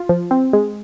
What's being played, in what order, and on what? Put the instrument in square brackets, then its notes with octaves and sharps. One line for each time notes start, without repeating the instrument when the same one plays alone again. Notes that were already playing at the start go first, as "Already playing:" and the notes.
Already playing: [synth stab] F4
F3
C4
G#3